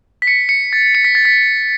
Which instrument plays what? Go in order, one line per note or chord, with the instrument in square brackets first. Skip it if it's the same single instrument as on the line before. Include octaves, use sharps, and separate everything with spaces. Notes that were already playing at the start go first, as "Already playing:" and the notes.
[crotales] B6
C#7
C#7
A6
C#7
B6
A6
B6